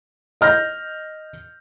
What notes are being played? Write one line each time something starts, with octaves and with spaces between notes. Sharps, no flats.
D#5 F6 G6 A#6